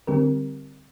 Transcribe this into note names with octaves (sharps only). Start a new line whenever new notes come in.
D3 G3 C4 G4 A#4